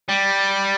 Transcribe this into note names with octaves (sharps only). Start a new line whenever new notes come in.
G3